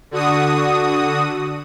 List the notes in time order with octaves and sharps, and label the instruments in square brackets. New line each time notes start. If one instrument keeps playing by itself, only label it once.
[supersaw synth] D3 F#4 D#6